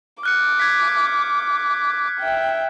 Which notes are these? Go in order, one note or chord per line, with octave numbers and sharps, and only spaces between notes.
D6 F6 F#6 C#7
G#6 B6
E5 G5